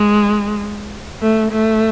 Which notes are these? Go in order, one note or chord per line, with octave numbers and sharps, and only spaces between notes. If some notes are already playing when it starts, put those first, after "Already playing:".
Already playing: G#3
A3
A3